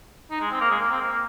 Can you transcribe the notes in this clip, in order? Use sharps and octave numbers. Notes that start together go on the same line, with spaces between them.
D#4
G#3
C4
A#3
G#3
A#3
C4
A#3
A#3